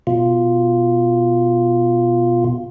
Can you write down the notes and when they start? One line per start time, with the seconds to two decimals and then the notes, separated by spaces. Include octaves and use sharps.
0.07 B2 F4